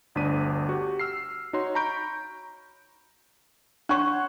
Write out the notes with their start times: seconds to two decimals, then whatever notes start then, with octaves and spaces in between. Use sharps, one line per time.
0.15 G1 D2 D4 B6 D#7
0.69 F#4 G4
0.99 E6 F6 C7
1.53 D#4 F#4 C#5 C6
1.75 A#5 B5 C#6 G6 D7
3.89 D4 C5 C#5 F#5 C#6